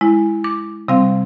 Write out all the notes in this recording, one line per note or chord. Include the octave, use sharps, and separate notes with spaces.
G#3 E4
D6
C3 G3 C4 F5